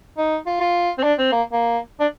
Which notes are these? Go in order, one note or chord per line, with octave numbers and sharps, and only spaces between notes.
D#4
F4
F4
C4
D4
C4
A#3
A#3
D4